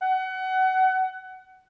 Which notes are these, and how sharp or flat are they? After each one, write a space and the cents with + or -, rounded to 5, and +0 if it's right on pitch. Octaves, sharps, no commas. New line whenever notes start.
F#5 +25